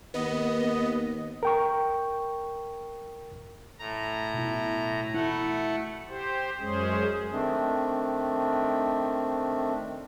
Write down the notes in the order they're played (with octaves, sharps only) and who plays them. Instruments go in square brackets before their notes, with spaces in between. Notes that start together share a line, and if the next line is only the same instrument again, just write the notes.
[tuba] D#2 [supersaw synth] B3 [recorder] D#5
[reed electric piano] A#4 G5 C#6
[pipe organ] A2 A#5
[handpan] B2 E4
[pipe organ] A3 F#5 [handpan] E4
[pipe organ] G4 C5
F#2 G#3 C#4 G#4 C5
[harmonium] D#3 A3 C4 D4